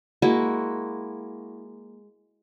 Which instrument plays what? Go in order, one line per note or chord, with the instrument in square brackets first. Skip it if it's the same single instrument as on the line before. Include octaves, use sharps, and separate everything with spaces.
[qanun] G#3 A#3 E4 F#4